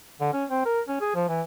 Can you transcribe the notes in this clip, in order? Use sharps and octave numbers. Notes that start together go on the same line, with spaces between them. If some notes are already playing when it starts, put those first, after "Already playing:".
D3
C#4
C4
A#4
C#4
G#4
F3
E3